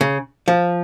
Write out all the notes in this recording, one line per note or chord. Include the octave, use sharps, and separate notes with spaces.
C#3
F3